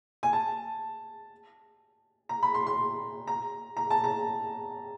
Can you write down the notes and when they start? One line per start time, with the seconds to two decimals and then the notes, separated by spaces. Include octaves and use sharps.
0.23 G#5
0.33 A5
2.29 A#5
2.43 B5
2.54 C6
2.67 C6
3.27 A#5
3.77 A#5
3.90 A5
4.04 A#5